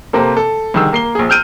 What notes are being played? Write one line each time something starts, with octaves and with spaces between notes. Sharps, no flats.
C3 A#3 C4 A4
A4
C2 D3 D#3 G#4 E6
A#3 C7 G7
A#1 G#4
E6 F6 G6 D7 D#7